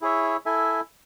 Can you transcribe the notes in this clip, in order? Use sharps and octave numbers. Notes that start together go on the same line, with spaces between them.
E4 G#4 C#5 E5
E4 A4 E5 G#5